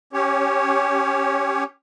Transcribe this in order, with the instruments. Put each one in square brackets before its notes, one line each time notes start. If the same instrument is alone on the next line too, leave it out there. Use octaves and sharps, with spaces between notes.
[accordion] C#4 G4 C#5